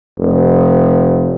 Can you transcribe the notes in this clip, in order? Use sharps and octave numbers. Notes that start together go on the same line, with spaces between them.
F1